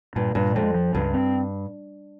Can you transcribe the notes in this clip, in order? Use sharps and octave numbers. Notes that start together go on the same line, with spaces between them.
G2 A#2
G2 A#2
F2 G#3
F3
C#2 G2
C4